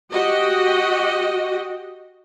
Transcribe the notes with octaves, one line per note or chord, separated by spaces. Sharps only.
F#4 G4 D#5